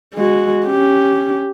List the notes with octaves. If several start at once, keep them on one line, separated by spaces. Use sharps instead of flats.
G#3 F#4
C#4 G4